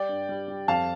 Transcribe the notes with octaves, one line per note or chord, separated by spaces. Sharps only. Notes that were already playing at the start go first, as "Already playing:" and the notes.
Already playing: G3 D5 G5
G2
G3
G3
F2 F5 A5